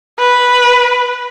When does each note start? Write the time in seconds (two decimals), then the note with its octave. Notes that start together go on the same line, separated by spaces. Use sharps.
0.19 B4